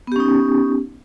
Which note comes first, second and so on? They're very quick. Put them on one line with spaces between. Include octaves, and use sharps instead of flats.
B3 G4 C#4 D#4